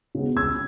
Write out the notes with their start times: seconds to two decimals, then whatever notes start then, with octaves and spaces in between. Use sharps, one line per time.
0.15 C#3 G#3 B3
0.36 C#2 E6 G#6